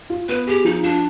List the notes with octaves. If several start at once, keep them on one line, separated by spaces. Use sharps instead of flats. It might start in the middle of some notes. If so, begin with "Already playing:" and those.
F4
B3 B4
G4 G#4
F3 D#4
D4 F4